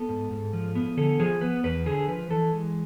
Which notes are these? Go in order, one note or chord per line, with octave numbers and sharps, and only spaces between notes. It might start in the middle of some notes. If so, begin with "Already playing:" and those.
Already playing: B3 A4
G#2
G#2
F3
B3
D3 A4
F3 G#4
B3 B4
E2 B4
D3 G#4
F3 B4
E3 A4
G#3